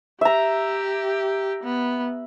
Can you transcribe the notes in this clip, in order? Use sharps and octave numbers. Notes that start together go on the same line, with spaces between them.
G4 E5 A#5
B3